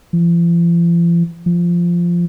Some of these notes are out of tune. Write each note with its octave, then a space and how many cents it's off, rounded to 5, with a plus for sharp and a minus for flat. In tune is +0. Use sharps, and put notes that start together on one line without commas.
F3 -45
F3 -10